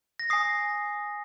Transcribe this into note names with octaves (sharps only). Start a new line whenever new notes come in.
A#6
G#5 D#6 C7